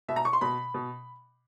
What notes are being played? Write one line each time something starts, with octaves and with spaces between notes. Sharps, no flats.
B2 E5
A#5
C#6
C6
B2 B5
B2